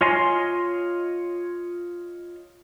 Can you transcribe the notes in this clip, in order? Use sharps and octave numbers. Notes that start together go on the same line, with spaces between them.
F4 C#5 D#5 G#5 C6